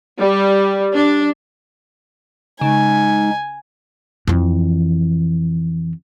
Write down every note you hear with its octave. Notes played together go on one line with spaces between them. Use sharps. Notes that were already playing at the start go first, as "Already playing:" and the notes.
G3
D4
C#3 G#3 D#4 G#5
F2 E3